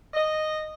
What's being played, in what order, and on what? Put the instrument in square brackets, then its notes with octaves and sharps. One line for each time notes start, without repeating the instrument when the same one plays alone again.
[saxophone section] D#5